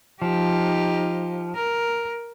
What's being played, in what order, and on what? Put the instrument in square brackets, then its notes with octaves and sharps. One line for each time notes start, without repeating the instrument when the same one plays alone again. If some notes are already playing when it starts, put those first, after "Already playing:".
[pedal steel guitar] F3 [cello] D#4 G4
[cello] A#4